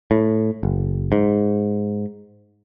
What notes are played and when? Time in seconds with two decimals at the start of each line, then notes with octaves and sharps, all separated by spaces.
0.11 A2
0.63 F#1
1.12 G#2